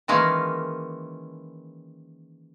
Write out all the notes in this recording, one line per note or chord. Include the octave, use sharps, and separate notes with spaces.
D#3 E3 G#3 A#3 C#4